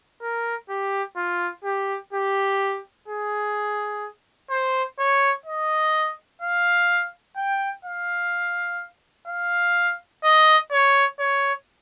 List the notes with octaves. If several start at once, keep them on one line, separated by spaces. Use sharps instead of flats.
A#4
G4
F4
G4
G4
G#4
C5
C#5
D#5
F5
G5
F5
F5
D#5
C#5
C#5